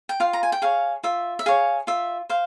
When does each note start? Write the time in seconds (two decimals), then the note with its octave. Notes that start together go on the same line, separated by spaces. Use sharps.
0.09 G5
0.20 F4 F5
0.33 A#5
0.43 G#5
0.52 G5
0.62 G#4 C#5 F5
1.03 F4 E5
1.39 E5
1.46 G#4 C#5 F5
1.87 F4 E5
2.30 C5 F5